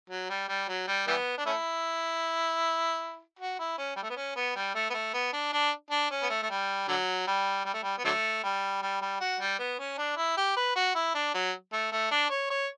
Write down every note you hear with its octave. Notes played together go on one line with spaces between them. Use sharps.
F#3
G3
G3
F#3
G3
E3 G3 B3
D4
A3 C#4 E4
F#4
E4
C#4
G3
A3
B3
C#4
B3
G3
A3
B3
A3
B3
D4
D4
D4
C#4
B3
A3
A3
G3
D3 F#3
G3
G3
A3
G3
B3
D3 F#3 A3
G3
G3
G3
F#4
G3
B3
C#4
D4
E4
G4
B4
F#4
E4
D4
F#3
A3
A3
D4
C#5
C#5